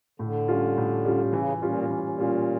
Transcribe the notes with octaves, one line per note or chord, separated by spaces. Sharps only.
A2 D3
G3 C#4 F4
A2
G3 C#4 F4
D3
C#3 E3
C#3
A#2 G3 C#4 F4
A#2 E3
A2
A#2
G3 C#4 F4